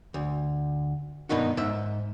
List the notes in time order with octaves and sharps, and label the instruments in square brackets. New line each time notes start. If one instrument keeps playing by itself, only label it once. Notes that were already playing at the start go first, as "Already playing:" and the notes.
[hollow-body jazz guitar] D2
G2 B2 D#3 D#4 F#4
G#2 E5